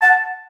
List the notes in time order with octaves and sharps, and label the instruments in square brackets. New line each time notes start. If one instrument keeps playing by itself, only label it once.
[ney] F#5 [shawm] A5